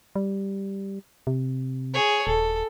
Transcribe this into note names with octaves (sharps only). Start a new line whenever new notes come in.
G3
C3
G#4 C#5
D#1 A4